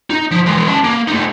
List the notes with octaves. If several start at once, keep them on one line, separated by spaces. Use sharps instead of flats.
D#4
F3
E3 G#3
C#4 A5
A#3
A3 D#4